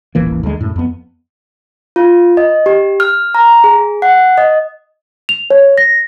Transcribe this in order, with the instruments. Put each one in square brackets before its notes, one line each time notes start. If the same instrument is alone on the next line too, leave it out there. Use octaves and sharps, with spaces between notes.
[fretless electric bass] D#1 A1 E3 A#3
D2 D3 G3 G#3
F#2 A2
F2 B3
[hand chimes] F4
D#5
G4
F6
A#5
G#4
F#5
D#5
[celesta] F7
C#5
A#6